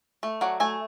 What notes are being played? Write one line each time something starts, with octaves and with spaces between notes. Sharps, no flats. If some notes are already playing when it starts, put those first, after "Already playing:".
A3
F#3 D5 F#5
A3 E5 G#5